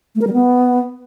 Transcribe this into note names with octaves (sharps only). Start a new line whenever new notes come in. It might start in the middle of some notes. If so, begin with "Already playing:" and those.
A3
A#4
G3
B3